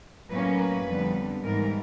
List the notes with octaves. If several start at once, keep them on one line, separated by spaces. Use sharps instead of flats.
A2 F#3 A#3 C#4 B4
B4
F2 D3 G3 B3
G#2 E3 G3 A#4